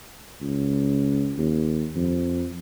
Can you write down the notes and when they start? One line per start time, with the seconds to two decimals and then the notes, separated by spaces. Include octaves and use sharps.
0.41 C#2
1.38 D#2
1.95 F2